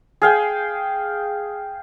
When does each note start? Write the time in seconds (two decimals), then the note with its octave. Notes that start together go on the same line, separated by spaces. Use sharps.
0.22 G#4 F5 G5